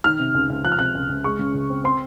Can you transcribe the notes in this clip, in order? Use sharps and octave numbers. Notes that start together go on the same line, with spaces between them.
D#3 F6
C3
C#2
C#2
F3 F#6
F6
C3 F#6
C#2
C#2
G#3 C#6
C#3
C#2
C4
C4 C6